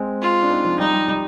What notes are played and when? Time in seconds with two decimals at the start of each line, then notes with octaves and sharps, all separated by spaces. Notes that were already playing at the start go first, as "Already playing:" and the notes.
Already playing: G#3 C4
0.21 F4
0.43 D4
0.50 C4 D#4
0.65 F3
0.79 G3 D#4
0.93 G3
1.08 G3